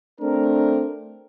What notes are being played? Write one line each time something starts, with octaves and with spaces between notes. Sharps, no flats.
A3 C4 D4 A#4